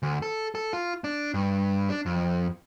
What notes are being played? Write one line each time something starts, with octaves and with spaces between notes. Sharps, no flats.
D2
A4
A4
F4
D4
G2
D4
F2